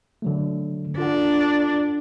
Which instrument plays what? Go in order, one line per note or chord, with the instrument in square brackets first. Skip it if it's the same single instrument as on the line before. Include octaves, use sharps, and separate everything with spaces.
[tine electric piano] D3 F#3 A3
[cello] D4 [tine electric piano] F4 A4 F#5